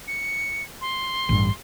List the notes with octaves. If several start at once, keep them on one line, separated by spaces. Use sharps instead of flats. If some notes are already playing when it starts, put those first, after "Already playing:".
C#7
C6
A1 G2